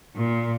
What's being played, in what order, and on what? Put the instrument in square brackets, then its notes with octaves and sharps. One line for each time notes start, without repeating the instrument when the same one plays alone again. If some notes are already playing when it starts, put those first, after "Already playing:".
[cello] A#2